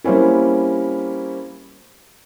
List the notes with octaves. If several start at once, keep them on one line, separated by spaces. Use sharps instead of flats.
G3 A#3 C4 C#4 E4